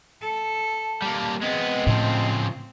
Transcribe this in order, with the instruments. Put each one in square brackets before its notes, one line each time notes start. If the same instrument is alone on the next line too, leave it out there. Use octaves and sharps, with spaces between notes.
[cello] A4 [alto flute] A5
[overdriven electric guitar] G3 A#3
[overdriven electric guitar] G#3 B3 [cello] C4 [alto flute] D#5
[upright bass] A2 [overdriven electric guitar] C#3 F3